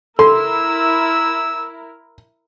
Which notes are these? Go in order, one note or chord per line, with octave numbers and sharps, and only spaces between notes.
E4 A4 A#4 C6 E6